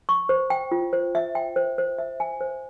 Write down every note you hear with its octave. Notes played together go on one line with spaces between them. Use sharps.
C#6
C5
G5
F4
C5
E5
G5
C5
C5
E5
G#5
C5